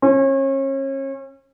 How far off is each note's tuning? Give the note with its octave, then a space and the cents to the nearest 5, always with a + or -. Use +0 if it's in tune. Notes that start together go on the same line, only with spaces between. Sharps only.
C#4 -35